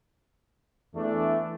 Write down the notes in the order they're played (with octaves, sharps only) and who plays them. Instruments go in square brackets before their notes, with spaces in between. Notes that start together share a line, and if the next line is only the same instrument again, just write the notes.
[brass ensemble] E2 E3 A3 D4